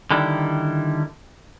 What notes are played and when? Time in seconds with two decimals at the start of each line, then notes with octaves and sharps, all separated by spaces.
0.10 D3 D#3 G3 E4